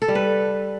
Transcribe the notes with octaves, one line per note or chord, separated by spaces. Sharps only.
A4
G3
B4